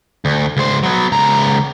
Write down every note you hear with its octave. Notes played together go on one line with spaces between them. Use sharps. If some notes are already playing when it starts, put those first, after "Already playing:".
D2
C#2 C5
F#3 B3
C#2 A#5